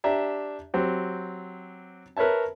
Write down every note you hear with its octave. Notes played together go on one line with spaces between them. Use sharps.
D4 G4 E5 A#5
F#3 C4 G4
A#4 B4 C#5 E5 A5